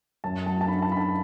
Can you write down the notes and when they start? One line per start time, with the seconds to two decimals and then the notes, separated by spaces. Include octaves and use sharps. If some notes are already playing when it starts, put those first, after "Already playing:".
0.24 F#2 A5
0.46 F#3 A5
0.61 A5
0.68 D4 B5
0.78 B5
0.82 A5
0.90 D4 B5
0.97 A5